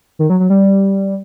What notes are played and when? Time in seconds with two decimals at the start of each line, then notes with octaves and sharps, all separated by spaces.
0.19 D#3
0.30 F#3
0.40 F#3
0.50 G3